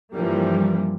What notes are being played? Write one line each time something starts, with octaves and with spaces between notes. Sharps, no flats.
G2 E3 F3 G3 A#3